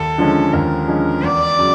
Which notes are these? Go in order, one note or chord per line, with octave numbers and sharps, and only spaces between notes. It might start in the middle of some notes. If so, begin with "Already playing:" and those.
Already playing: D#2 A4
D3 F3 G#3 C#4
D#2 A#4
D3 F3 G#3 C#4
E2 D5
C#3 F#3